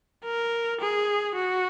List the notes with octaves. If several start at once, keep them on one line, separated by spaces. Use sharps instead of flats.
A#4
G#4
F#4